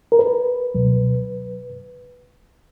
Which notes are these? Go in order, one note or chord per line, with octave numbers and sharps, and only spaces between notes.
A#4
B4
C#2 B2 F#3